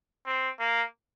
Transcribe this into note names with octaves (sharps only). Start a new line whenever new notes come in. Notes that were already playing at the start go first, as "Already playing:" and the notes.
C4
A#3